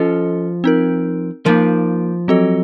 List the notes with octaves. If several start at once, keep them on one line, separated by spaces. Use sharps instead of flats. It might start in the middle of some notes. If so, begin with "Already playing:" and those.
Already playing: F3 C#4 F4 A4 D#5
C4 D#4 A#4
F3 A#3 D#4 F4 A#4
F#3 C4 F#4 A4 D#5